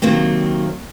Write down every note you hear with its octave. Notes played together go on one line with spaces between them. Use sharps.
C3 D#3 F#3 A#3 C4